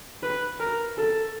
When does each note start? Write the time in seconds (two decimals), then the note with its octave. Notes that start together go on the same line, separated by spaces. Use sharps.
0.23 B4
0.60 A#4
0.97 A4